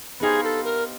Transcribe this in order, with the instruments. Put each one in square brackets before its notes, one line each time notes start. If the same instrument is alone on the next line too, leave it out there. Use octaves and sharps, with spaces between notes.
[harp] B3 D#4 G4 C5 F5 [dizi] G#4
[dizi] A4
A#4